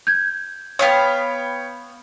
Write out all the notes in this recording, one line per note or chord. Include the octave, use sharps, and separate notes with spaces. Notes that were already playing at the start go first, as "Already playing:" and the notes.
G6 G#6
B3 C#5 F5 G5 D#6